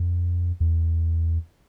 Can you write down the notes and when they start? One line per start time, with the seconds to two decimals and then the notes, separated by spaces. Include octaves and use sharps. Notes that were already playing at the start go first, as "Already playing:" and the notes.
Already playing: F2
0.60 E2